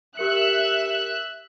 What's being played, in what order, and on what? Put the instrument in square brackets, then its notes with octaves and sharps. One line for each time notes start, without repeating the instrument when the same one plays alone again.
[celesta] G4 A#4 C#7 [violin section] E5 F#6